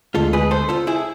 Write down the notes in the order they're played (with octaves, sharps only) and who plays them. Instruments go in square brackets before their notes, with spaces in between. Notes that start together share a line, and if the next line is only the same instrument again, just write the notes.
[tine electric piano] D2 D3 G#3 [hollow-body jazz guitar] F4 A4
[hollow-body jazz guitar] G#4 B4
A4 C5
F4 A4
E4 G#4